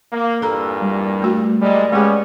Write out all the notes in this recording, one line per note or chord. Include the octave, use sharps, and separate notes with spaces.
A#3
E2 G2 A#2 A4 A#5 E6
G3
A3 F#4
A#2 G3 G#3 D5
G#3 B3 C#4 G4 G#4